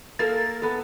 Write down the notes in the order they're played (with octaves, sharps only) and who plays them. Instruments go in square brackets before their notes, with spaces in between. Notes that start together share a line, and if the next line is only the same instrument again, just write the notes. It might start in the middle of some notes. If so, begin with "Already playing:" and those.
[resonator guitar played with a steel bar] A#3 A4 A#4 [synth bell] A6
[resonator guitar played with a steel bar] B3 A4